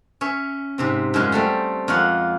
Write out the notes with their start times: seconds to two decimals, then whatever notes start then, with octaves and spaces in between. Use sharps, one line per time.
0.21 C#4 C#5 E5
0.78 G#2 C3 C4
1.14 F#2 F3 G#3 C#4
1.32 G3 A3 C4
1.88 F2 G#3 A#3 F4 C#5 F#5